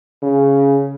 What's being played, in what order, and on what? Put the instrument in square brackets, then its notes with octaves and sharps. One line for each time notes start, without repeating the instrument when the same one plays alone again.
[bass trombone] C#3